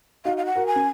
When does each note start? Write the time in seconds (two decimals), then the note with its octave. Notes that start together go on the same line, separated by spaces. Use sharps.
0.25 D#4 F#4 F5
0.37 F5
0.45 F#5
0.56 F#4 A#4
0.67 G#5
0.76 C#4